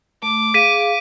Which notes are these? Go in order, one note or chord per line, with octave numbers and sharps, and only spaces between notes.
A3 D6
G#4 F5 B6 D#7